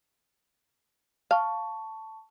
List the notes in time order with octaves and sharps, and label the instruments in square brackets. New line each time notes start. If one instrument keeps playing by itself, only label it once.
[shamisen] F5 [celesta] A5 C#6